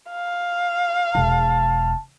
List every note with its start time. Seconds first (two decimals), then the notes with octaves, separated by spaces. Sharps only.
0.10 F5
1.15 E1 A5